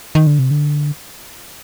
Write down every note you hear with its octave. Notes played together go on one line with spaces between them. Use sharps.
D#3
D3
C3
D3